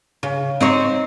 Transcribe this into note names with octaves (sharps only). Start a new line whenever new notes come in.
C#3
C4 D#4 C#5